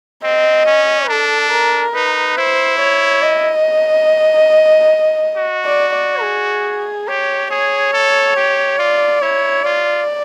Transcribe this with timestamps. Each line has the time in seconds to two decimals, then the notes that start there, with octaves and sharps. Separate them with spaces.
0.23 C4 D#5
0.66 C#4
1.09 D4 A4
1.52 A#4
1.94 D#4 B4
2.37 E4 C5
2.80 C#5
3.22 D#5
5.37 F#4
5.65 D5
5.94 D5
6.22 G#4
7.08 G4 C#5
7.51 G#4 C#5
7.93 A4
8.36 G4
8.79 F4 D5
9.21 E4 C#5
9.64 F4 D5